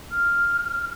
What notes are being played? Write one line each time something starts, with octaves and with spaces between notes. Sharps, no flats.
F6